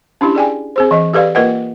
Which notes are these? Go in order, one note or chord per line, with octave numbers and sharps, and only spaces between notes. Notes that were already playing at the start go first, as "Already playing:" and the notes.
C#4 D4 E4 G4
G#4 D5 G5 G#5
C4 G#4 C5
E3 D#5
G4 A4 B4 D5 F5
A#3 F4 A#4 B4 D#5 F#5